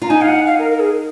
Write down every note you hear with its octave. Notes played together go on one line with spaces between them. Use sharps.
F4 A#5
D#4 G#5
F5
F#5
F5
A#4
A#4
G#4